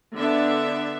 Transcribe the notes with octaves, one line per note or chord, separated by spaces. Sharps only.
D3 B3 D4 E5